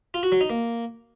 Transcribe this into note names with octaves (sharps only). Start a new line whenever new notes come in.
F4
F#4
F#3
D#4
A#3